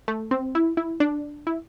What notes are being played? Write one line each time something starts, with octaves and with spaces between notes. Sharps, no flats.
A3
C4
E4
E4
D4
E4